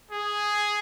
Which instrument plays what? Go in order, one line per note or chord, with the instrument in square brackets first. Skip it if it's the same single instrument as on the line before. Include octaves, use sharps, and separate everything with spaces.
[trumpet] G#4